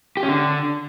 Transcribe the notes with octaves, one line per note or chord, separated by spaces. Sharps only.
G4
C#4
D3